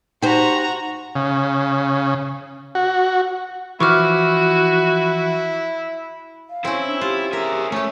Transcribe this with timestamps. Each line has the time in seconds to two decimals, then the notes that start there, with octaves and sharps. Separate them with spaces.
0.22 D#4 F#4 G4 C5 A#5
1.16 C#3
2.75 F#4
3.80 E3 F3 E4 F#4 C#6 D6 F6
6.50 F5
6.65 C4 C#4 E4
6.87 D4
7.01 F4 G4
7.33 G#4 A#4 E5
7.72 A3 C#4 C#5